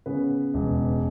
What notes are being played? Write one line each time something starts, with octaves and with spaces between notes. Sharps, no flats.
C#3 B3 B4
E1